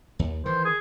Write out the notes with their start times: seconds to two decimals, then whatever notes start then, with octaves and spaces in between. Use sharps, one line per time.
0.19 D#2
0.46 D#3 E3 C5
0.65 G#4